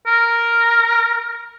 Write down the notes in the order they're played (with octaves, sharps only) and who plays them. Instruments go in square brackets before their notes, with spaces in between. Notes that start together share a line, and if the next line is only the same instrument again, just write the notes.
[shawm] A#4